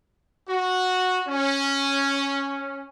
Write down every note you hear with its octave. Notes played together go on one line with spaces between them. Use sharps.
F#4
C#4